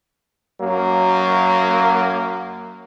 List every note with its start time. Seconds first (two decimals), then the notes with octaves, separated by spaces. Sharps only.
0.61 F#2 F#3 A#3